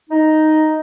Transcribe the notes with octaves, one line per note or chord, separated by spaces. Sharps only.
D#4